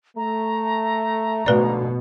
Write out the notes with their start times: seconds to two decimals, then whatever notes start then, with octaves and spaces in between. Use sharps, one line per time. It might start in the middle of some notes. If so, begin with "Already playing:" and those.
0.17 A3 A#5
1.46 G#2 B2 D3 F3 A3 B4 D5